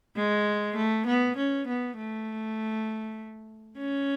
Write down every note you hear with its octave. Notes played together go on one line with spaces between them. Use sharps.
G#3
A3
B3
C#4
B3
A3
C#4